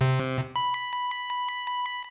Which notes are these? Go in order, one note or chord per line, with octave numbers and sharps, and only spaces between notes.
C3
B5